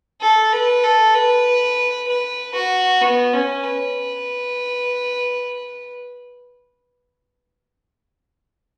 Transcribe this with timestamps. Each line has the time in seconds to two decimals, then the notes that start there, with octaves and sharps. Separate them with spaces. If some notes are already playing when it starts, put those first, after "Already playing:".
0.21 A4
0.53 B4
0.84 A4
1.15 B4
2.08 B4
2.55 F#4
3.02 B3
3.33 C#4
3.64 B4